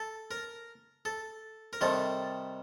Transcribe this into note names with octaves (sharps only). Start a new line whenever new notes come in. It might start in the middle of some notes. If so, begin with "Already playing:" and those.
Already playing: A4
A#4
A4
A#4
C3 D#3 G3 A4